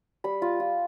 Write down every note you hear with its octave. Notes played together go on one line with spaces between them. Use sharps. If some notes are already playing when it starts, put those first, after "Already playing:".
G3 B5
F4
F4